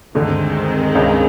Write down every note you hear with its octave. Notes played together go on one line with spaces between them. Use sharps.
D2 G2 D3 D#3 G#3 C4
C#2 C#3